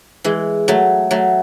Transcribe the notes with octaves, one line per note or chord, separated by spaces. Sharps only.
E3 G#3
F#3 A3
F#3 A3